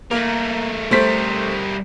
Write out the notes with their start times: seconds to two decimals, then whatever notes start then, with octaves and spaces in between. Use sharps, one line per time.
0.11 A3 A#3 A#4
0.91 G3 A3 A#4 C5 B6